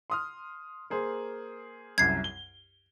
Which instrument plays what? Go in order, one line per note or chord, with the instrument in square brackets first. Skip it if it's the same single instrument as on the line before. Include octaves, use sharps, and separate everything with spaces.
[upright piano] C6 D#6 F6
A#3 G#4 C5
[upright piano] C2 F#2 [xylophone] G#6 C7
[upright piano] G7